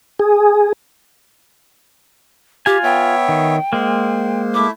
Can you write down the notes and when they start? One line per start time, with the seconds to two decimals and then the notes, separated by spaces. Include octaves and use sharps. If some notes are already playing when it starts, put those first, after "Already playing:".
0.19 G#4
2.66 F4 G4 G#5
2.84 B3 C#5 E5 G5
3.29 D#3
3.73 G#3 A#3 C5
4.54 A3 E4 E5 D6